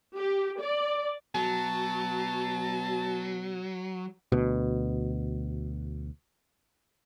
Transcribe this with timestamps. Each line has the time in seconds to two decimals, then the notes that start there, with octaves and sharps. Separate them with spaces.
0.16 G4
0.60 D5
1.35 B2 F#3 A5
4.32 D2 B2